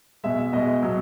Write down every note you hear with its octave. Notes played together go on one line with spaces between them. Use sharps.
B2 G#3 E5
E5
B2 G#3 D#5
B2 F#3